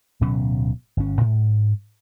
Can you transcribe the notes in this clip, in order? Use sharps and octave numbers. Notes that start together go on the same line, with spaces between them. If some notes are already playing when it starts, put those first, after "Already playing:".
D1 B2 F#3 C#4
G1 C#4
G#2